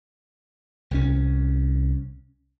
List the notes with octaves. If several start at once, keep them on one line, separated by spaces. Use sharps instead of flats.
C2 E3 C#4